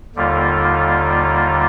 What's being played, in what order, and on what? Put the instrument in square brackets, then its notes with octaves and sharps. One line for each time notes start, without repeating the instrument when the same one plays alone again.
[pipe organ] D#2 D3 G3 A#3 F4